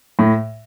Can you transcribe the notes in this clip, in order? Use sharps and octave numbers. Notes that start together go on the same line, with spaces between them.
A2